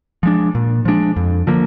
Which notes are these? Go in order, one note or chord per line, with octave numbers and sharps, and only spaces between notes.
F3 G#3 D4
A#2
F3 G#3 D4
F2
D3 F3 A#3